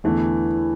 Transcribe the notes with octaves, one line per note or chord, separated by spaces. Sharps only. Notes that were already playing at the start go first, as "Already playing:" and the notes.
E2 D3 E3 A3